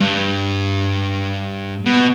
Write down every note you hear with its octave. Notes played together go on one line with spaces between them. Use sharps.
G2
B2